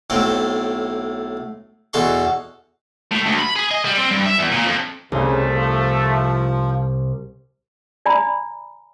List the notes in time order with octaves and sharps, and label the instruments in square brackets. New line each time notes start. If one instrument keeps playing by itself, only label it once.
[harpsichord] B1 A2 A3 C4 G5
E2 B2 A4 C6 C#6
[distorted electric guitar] A2
D2
B5
G#4
D#5
G3
C4
G2
E5
E2
A#2
F2
[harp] C2 [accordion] C#3 [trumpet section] A3
[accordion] F3
[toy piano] D5 G#5 A#5 B5